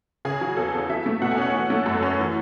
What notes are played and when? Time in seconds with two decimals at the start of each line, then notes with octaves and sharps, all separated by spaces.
0.25 C#3 G#4
0.41 F#3
0.57 E2 A4
0.73 E2
0.89 F#3 E5
1.06 A3
1.22 B2 F#5
1.31 G#5
1.38 C#4 F#5
1.54 E3
1.70 A3
1.86 F#2
2.02 C#4
2.19 E3